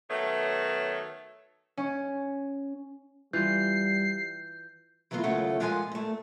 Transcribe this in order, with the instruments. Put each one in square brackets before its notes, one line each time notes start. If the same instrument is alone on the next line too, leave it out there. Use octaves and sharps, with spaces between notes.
[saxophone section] D#3 F#3 A3 B3 C#5
[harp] C#4
[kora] E3 F4 [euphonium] G3 [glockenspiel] G6 [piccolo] C7
[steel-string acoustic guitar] E3 F#3 A3 B3 F4
D#2 C#3 F#3 A3 F4 F#5
A#2 F3 G#3 F4 F#5 G#5
A#2 A3